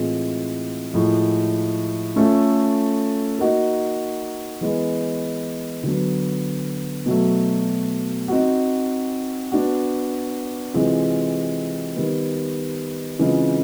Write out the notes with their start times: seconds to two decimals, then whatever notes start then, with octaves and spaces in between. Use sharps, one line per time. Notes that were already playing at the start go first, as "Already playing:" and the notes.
Already playing: A2 E3 G#3 C4 F4
0.94 A2 F3 G#3
2.16 A3 C#4 F4 A4
3.38 A#3 D#4 F#4
4.61 E3 G#3 B3
5.83 D3 F#3 B3
7.06 B2 F#3 A3
8.28 C4 D#4 F#4
9.52 B3 D4 F#4
10.74 C3 E3 G#3 C4 F4
11.96 D#3 G3 B3
13.19 C#3 E3 G#3 C4 F4